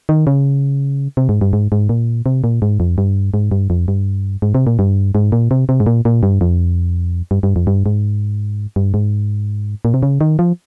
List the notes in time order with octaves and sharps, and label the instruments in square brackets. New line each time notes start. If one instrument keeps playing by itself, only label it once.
[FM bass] D#3
C#3
C3
G#2
G2
G#2
G#2
A#2
C3
A#2
G#2
F2
G2
G#2
G2
F2
G2
G#2
C3
A#2
G2
G#2
A#2
C3
C3
G#2
A#2
A#2
G2
F2
G2
G2
F2
G2
G#2
G2
G#2
A#2
C3
C#3
D#3
F3